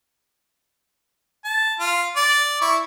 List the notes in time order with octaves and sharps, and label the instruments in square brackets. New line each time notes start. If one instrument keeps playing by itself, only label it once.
[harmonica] A5
F4
D5
E4 C#6